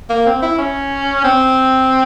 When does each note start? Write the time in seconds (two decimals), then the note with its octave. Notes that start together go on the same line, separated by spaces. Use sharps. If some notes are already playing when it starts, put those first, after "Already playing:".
0.09 A#3
0.26 C4
0.42 E4
0.58 C#4
1.24 C4